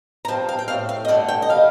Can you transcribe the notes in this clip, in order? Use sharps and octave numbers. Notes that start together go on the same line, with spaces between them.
A#5
G2 F3 C4 A5
F5
G5
A2 A3 C4 F5
F5
D#5
G2 D3 A3 D4 D5
G5
D#5
D#3 G3 F5